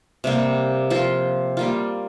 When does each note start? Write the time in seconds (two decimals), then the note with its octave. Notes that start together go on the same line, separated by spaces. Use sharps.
0.24 C3 G3 A#3
0.90 F3 C4 F4 C5
1.57 G3 A#3 F4